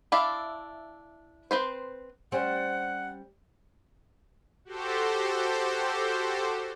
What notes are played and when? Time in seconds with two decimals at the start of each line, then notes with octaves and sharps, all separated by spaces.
0.12 D4 E4 D5 E5 F5
1.51 C4 B4 C5
2.32 G3 C4 C#4 F#5
4.65 F#4 G4 A4 C5